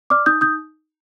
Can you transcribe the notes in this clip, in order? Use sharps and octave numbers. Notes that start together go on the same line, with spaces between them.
D5 D6 F6
D#4 D#6 G6
D#4 D#6 G6